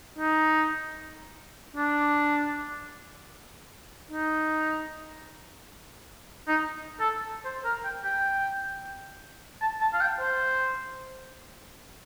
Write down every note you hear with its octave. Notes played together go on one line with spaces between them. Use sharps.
D#4
D4
D#4
D#4
A4
C5
A#4
G5
G5
A5
A5
F5
G5
C5